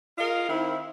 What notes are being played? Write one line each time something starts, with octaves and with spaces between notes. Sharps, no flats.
F4 G#4 A#4 D#5 F5
D#3 C4 E4